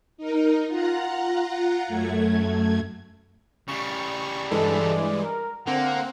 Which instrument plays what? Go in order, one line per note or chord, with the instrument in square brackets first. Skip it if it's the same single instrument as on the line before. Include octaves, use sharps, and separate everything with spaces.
[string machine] D#4 A#4
F4 F#5 A#5
F#2 A3 G#6
[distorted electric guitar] C#3 G3 [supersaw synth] C#6
[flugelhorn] D5
[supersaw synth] G2 E3 G#3 [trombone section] A4
[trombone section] A#4
[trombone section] D3 [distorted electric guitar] A#3 [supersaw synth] C4 [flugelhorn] F#5